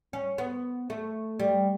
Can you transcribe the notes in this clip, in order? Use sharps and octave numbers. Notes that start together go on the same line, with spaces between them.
C#4
B3
A3
G3